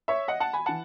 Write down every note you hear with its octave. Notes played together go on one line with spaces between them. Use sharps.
C#5 E5
D#5 F#5
F#5 A5
G#5 B5
E3 F#5 A5